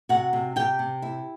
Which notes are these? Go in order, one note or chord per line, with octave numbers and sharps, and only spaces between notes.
C3 F#4 F#5
C3
C3 G4 G5
C3
E4